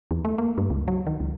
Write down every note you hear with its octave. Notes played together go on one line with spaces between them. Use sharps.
E2
A3
A#3
G2
C#2
F#3
D#3
C#2